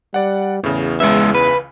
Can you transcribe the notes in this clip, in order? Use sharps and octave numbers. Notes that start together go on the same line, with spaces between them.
G3 D5 F#5
E2 A2 C#3
C#2 C#3 E3 G#3 E5
B4